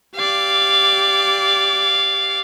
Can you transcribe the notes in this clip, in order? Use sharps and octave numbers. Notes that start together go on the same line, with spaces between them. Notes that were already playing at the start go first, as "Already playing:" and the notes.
G4 D5 F5